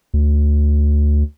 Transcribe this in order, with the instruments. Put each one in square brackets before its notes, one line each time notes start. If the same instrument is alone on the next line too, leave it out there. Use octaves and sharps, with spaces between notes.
[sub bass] D2